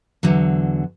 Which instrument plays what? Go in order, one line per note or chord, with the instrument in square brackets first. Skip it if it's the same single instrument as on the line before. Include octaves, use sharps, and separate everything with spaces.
[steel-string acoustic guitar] E2 D3 F#3